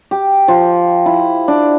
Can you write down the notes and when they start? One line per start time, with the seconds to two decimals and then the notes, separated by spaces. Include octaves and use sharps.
0.11 G4
0.48 F3
1.06 E4
1.48 D4